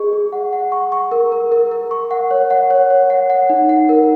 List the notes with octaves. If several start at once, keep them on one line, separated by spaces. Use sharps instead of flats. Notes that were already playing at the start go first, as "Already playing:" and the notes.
Already playing: G#4 D#5 C#6
G#4
F#5
F#5
C#6
C#6
A#4
A#4
A#4
A#4
C#6
F#5
C#5
F#5
C#5
C#5
F#5
F#5
D#4
F#5
A#4